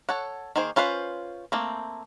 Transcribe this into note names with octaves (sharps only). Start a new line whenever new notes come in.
A4 C#5 F#5
D#3 A#3 G#4 C5
C#4 F4 B4 C5 F5
A3 A#3 C4